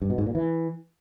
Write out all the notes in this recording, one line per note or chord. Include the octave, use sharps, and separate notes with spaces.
G2
B2
G#2
A#2
E3